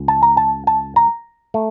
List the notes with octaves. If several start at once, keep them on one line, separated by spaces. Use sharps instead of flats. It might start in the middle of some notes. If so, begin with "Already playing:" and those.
Already playing: C#2
A5
A#5
A5
A5
A#5
A3